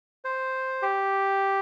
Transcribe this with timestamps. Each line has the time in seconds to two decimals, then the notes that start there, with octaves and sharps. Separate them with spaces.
0.25 C5
0.82 G4